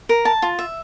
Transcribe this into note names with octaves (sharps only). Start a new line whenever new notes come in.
A#4
A5
F4
E5